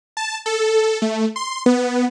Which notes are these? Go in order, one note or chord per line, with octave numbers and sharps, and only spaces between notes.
A5
A4
A3
C6
B3